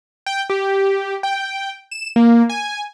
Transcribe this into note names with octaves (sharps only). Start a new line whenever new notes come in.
G5
G4
G5
E7
A#3
G#5